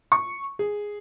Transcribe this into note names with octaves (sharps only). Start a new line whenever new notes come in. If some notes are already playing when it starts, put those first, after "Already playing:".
C#6
G#4